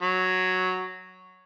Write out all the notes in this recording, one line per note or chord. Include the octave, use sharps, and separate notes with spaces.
F#3